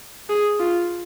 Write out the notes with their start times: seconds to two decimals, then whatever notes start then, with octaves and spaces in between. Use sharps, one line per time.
0.29 G#4
0.60 F4